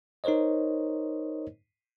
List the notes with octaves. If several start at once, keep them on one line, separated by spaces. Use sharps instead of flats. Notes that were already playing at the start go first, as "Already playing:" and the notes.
D#4 A#4 C5 C#5 D#5